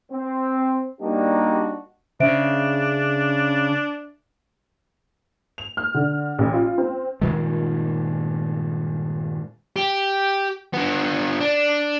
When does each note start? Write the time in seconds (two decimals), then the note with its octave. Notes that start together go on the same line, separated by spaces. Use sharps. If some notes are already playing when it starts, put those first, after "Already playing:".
0.11 C4
1.01 G3 A#3 D4 D#4 F#4 G4
2.20 C#3 D4 C5 E5 D7
5.58 F7
5.77 F6
5.94 D3
6.39 A1
6.53 F4
6.78 C4
7.22 G2 A#2 D#3 G#3
9.76 G4
10.73 D3 B3
11.40 D4